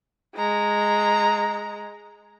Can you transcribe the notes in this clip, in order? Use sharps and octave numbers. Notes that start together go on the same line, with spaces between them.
G#3 A#5